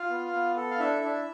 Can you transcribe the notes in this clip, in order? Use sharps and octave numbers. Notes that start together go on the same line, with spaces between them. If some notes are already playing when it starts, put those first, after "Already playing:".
Already playing: F4 F5
B3
B3
A4
F5
D4 E4 E5
D4